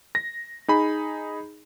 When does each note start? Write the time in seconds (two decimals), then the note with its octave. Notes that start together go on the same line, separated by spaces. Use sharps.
0.15 A#6
0.68 D#4 G#4 B5